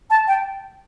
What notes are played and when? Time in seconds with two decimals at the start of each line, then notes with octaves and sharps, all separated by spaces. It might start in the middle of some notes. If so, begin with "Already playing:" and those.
0.10 A5
0.28 G5